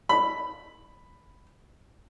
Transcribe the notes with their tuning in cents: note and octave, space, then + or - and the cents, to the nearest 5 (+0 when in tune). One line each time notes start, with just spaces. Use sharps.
B5 +5